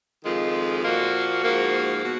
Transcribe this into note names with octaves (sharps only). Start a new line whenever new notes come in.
F2 D#3 G#3 F4
F4
A#2 F3 A#3 F#4
G#2 F3 A#3
B2 F#4